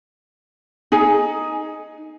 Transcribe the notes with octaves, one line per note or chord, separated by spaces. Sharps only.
D#4 G#4 G#5